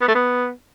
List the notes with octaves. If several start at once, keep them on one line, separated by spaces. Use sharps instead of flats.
B3
A3
B3